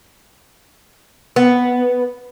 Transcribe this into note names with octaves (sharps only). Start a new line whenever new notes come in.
B3